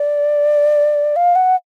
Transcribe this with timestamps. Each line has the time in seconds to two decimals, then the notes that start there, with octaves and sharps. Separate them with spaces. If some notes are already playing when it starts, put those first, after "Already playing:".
Already playing: D5
1.16 F5
1.36 F#5